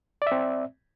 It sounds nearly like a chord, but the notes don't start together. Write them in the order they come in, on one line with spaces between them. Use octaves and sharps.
D5 E5 C4